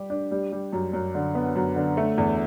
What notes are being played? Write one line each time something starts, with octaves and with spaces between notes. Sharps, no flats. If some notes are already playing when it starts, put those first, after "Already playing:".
Already playing: G3 G4
D4
G3
G3
F#2
F#2
D3
B3
F#2
D3
A3
E2